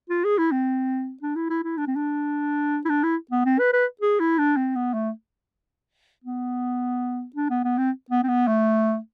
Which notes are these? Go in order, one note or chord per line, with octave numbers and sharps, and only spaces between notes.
F4
G#4
E4
C4
D4
E4
E4
E4
D4
C4
D4
E4
D4
E4
B3
C4
B4
B4
G#4
E4
D4
C4
B3
A3
B3
D4
B3
B3
C4
B3
C4
B3
A3